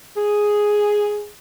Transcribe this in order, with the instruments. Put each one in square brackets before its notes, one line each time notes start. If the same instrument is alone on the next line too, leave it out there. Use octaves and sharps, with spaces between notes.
[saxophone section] G#4